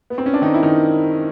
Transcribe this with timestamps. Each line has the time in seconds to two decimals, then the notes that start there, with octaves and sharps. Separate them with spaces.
0.10 B3
0.18 C4
0.26 C#4
0.34 D4
0.42 D#3 D#4
0.54 E4
0.63 D#3 D#4